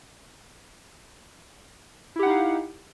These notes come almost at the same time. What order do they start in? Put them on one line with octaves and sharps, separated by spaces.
E4 G4 F#5 D#4 F5